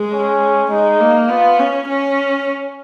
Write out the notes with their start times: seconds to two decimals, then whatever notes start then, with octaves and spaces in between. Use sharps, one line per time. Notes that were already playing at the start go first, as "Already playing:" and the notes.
Already playing: G#3
0.13 C#4
0.70 G#3 D#4
1.00 A#3
1.29 B3 F4
1.59 C#4
1.89 C#4